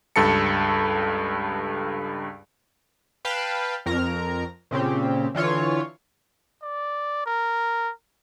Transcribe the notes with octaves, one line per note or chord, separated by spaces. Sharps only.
C#2 G2 A4 A5 C#7
B4 F5 G5 A5 B5
F2 A#4 A#5
A#2 C#3 C4 G4
D3 E3 F4 C#5
D5
A#4